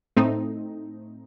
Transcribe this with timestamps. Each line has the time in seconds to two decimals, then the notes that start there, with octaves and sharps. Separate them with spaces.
0.17 A2 A3 C4 D#4